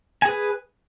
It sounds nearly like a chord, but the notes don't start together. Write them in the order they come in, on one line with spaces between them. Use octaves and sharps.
G#5 G#4 B4